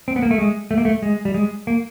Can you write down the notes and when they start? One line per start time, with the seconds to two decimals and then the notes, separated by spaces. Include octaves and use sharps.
0.08 C4
0.16 B3
0.22 A#3
0.31 A3
0.38 G#3
0.71 A3
0.78 A#3
0.85 A3
1.02 G#3
1.25 G3
1.34 G#3
1.67 A#3